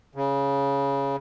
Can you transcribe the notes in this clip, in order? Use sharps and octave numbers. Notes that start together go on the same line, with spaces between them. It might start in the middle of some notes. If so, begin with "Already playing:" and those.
C#3